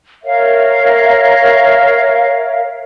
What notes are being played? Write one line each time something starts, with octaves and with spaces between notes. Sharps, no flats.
A#4 C#5 E5 F5